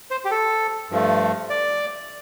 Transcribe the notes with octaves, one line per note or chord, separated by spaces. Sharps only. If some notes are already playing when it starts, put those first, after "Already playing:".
C5
G4
A4
G2 F3 A3
D5